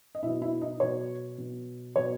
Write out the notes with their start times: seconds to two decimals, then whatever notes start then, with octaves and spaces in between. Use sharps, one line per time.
0.15 D#5
0.23 B2 F#3 E4 E5
0.42 E4 E5
0.62 D#4 D#5
0.80 B2 F#3 C#5
1.38 B2 F#3
1.96 B2 F#3 C#5